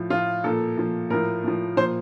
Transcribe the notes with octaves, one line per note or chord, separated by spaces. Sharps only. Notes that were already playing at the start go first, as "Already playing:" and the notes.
Already playing: A2 F3
A2 F3 F4
A#2 F3 A4
A#2 F3
A2 F3 A#4
A2 F3
A#2 F3 C5